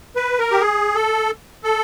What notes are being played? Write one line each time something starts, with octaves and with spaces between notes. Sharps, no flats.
B4
A#4
G4
G#4
A4
A4